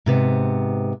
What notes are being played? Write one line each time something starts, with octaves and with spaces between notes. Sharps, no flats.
G#2 C3 B3